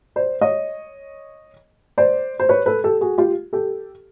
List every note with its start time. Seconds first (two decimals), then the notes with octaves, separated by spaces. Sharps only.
0.16 C5 D5
0.41 C#5 D#5
1.98 C5 D5
2.40 C5
2.49 B4 C#5
2.66 A4 B4
2.84 G4 A4
3.01 F#4 G#4
3.18 F4 G4
3.53 G4 A4